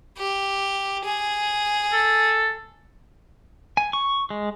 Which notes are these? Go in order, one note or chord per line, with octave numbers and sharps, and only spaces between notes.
G4
G#4
A4
G#5
C#6
G#3